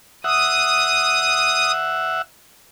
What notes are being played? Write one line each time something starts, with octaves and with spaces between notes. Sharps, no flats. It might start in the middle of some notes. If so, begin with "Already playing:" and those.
E5 F#5 D#6